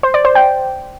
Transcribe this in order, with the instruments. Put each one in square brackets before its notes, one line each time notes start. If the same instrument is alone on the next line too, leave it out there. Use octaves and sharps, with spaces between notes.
[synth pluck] C5
D5
C5
G5